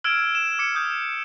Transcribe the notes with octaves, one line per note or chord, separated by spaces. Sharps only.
E6 F6 G#6 D7 E7
E7
D6 C#7
D#6 G6